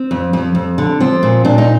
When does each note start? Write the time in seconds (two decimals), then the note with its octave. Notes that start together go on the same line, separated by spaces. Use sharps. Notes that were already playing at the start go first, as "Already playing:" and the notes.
Already playing: C4
0.11 F2
0.33 F2
0.55 F2
0.78 D3
1.00 F3 C4
1.23 A#2
1.45 A#2 D4
1.58 D#4